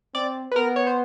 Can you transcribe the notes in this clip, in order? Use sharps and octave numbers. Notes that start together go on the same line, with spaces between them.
C4 D5
B4
B3 A#4
C#5
C5